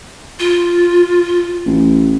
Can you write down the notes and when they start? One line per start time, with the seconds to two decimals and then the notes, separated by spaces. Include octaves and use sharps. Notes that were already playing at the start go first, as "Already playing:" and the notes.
0.39 F4
1.66 A1